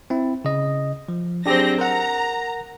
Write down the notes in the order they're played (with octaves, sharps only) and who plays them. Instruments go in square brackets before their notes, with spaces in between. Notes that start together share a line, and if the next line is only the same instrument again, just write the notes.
[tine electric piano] C4 E4
C#3 D#5
F3
[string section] F#3 C4 A#6 [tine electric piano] D4 G4 G#4
[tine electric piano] A#4 F#5 [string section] A#5